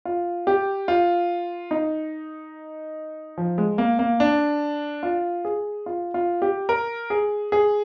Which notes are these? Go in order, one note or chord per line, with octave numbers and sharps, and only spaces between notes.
F4
G4
F4
D#4
F3
G#3
A#3
A#3
D4
F4
G#4
F4
F4
G4
A#4
G#4
G#4